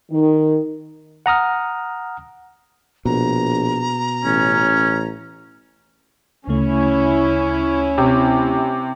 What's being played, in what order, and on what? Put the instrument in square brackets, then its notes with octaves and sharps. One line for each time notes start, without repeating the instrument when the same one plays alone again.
[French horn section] D#3
[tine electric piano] F#5 A#5 D#6 F6
[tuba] A#1 [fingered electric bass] B2 [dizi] A#5
[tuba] A1 [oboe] C#4
[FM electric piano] D2 C#3 A3 [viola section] C#4 E4
[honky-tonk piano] C3